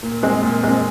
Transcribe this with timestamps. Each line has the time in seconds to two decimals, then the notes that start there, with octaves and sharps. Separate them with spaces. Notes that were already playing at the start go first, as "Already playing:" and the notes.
0.03 A#2
0.23 G#3 C4
0.43 A#2
0.64 G#3 C4